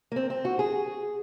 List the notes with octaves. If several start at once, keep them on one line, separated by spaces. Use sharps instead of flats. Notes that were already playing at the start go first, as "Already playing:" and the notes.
A#3
C4
C4
F#4
G#4